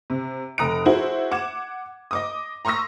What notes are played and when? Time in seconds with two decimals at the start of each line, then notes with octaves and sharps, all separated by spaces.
0.10 C3
0.58 F1 A#5 D#6 F#6 D7
0.85 E4 F#4 G#4 C5
1.31 F#5 D6 G#6 E7
2.11 D#5 D6 D#6
2.65 A#5 C6 C#6 D#6 E6 A#6